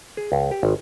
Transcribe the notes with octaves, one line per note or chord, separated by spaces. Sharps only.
G#4
C#2
G4
G#1